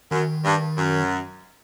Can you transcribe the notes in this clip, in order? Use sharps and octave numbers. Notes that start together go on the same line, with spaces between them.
F#2 D#3
G2
F#2